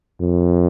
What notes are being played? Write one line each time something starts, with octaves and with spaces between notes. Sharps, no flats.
F2